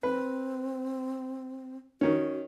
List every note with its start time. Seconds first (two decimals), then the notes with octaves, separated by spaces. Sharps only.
0.03 C4 B4
2.01 D#3 C#4 F#4